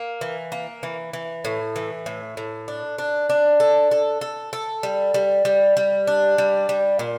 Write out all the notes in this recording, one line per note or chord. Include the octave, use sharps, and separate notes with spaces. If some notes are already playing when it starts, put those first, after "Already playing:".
Already playing: A#3
E3
A#3
E3
E3
A2
E3
A2
A2
D4
D4
D4
A4
A4
A4
A4
G3
G3
G3
G3
D4
G3
G3
A#2